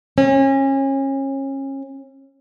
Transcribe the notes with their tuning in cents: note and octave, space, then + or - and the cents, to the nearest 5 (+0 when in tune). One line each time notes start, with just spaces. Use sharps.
C#4 -30